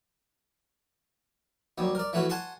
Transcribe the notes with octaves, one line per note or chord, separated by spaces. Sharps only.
D#2 F#3 G3
A#4 D5
E3 A3 C#4 F#4
F#5 G#5 A5 C6 C#6